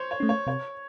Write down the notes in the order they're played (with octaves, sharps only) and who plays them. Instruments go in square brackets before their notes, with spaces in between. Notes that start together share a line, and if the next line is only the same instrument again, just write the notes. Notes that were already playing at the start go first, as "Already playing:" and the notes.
Already playing: [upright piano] C5 C#5
C#5
[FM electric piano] A3 C#4
[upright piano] C#5
[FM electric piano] C3 [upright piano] C#5